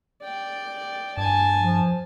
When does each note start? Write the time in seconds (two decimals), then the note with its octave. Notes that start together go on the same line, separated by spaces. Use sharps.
0.22 D5 G5
1.17 G2 G#5 A5
1.60 F3